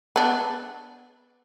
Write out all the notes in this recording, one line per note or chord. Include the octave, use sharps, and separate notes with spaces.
B3 D4